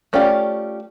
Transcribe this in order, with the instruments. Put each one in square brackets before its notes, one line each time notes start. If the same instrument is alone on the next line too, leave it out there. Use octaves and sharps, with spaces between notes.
[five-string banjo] A3 C#4 F4 G4 D5